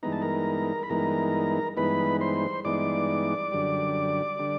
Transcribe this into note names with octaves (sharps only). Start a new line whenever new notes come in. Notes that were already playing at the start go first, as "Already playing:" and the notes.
G2 E3 G#3 B3 D#4 A#5
A5
A#4 A#5
B5
G2 E3 G#3 B3 D#4 A#4 A#5
G2 E3 G#3 B3 D#4 B4 B5
C5 C6
G2 E3 G#3 B3 D#4 D5 D6
F#2 D3 G3
D3 G3